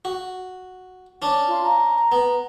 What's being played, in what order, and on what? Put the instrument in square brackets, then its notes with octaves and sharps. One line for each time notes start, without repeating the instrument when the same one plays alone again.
[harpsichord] F#4
C#4 D4
[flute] F4
A#5
[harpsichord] B3